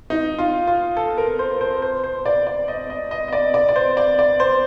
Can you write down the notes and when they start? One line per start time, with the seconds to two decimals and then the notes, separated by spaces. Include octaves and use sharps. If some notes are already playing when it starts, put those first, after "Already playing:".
0.10 D#4
0.39 F4
0.67 F4
0.97 A4
1.18 A#4
1.39 C5
1.61 C5
1.82 C5
2.04 C5
2.26 D5
2.47 D5
2.68 D#5
2.90 D#5
3.11 D#5
3.28 D#5
3.33 D5
3.54 D5
3.69 D5
3.76 C5
3.97 D5
4.19 D5
4.40 C5